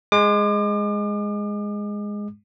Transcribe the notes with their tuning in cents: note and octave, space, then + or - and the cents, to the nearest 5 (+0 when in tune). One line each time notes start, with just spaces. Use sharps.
G#3 -5 D6 +40